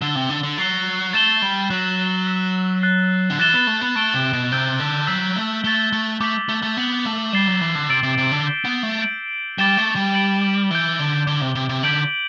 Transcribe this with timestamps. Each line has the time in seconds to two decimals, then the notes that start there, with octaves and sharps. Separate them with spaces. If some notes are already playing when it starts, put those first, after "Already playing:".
0.02 D3 E6 A6 E7 G7
0.15 C3
0.30 D3
0.43 D3
0.58 F#3 A6 C7 G7
1.13 A3 A6 E7 G7
1.42 G3
1.70 F#3 F#6 B6 F#7
2.27 E6 B6 E7 G7
2.82 F#6 A6 C7 G7
3.30 D3
3.39 E3 F#6 A6 E7 G7
3.54 B3
3.67 A3
3.81 B3
3.95 A3 A6 D7 G7
4.14 C3
4.33 B2
4.52 C3 E6 G6 D7 G7
4.80 D3
5.07 F#3 E6 B6 F#7
5.36 A3
5.64 A3 A6 E7 G7
5.93 A3
6.20 A3 D6 G6 B6 F#7
6.49 A3
6.63 A3
6.77 B3 A6 C7 F#7
7.05 A3
7.33 G3 A6 C7 E7 G7
7.47 F#3
7.61 E3
7.75 D3
7.89 C3 E6 A6 D7 F#7
8.03 C3
8.18 C3
8.31 D3
8.46 G6 B6 E7 G7
8.65 B3
8.83 A3
9.02 G6 D7 F#7
9.58 G3 D6 A6 E7 G7
9.77 A3
9.96 G3
10.14 A6 D7 F#7
10.71 E3 G6 D7 G7
10.99 D3
11.26 D3 D6 G6 D7 G7
11.41 C3
11.55 C3
11.69 C3
11.83 D3 G6 B6 D7 F#7